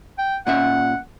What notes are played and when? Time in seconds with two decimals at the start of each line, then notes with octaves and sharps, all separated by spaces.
0.19 G5
0.47 A#2 C#4 E5 F#5